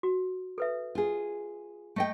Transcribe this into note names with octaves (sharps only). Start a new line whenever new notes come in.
F#4
A4 B4 E5
F4 G#4
A3 D#5 G5